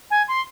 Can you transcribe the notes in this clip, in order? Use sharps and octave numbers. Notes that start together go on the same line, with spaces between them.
G#5
C6